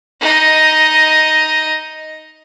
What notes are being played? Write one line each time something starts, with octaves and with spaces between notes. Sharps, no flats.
D#4 D#5